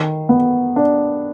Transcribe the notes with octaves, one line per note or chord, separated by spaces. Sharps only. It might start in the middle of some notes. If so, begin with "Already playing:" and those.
Already playing: D#3
B3
D4